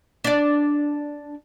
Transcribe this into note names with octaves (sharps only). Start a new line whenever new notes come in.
D4 D5